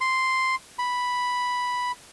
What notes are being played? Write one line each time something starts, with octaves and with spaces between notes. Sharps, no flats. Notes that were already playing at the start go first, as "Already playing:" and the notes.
C6
B5